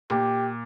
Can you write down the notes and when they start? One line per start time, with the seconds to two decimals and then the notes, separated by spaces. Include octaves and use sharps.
0.10 A#2 G4